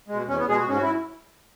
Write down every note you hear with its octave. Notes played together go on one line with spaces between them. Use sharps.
G#3
B2
E2 C#4
B3
B2 G#3 G#4
F#4
G#2 C#4
F#4
E4